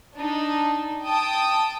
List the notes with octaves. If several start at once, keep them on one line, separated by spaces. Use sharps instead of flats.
D4 D#4
G5 A5 D#6